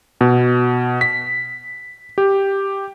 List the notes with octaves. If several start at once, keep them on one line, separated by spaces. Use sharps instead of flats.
B2
B6
G4